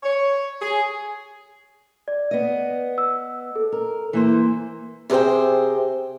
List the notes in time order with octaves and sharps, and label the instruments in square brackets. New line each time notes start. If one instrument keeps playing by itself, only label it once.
[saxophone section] C#5
G#4
[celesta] D5
[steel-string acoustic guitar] B3 D#5
[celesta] E6
A4
[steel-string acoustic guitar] A#4
E3 A#3 C5
C3 G#4 A#4 C5 G5